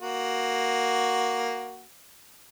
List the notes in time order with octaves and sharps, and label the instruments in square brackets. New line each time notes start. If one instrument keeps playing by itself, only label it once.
[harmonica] A#3 F#4